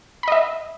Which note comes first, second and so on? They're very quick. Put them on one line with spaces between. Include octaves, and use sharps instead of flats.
B5 D#5 E5